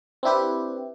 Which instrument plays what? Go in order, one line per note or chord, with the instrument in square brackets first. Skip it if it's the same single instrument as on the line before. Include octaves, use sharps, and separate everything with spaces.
[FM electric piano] C4 D4 E4 G4 B4